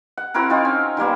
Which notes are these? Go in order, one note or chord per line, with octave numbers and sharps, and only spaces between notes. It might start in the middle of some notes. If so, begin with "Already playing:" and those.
F#5
C4 E4 F#4 A#4
C4 D#4 F4
C#4
D#3 G3 A#3 B3